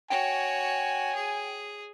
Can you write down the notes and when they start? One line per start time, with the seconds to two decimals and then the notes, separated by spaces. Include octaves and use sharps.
0.10 F#4 C#5 G5 G#5
1.15 G#4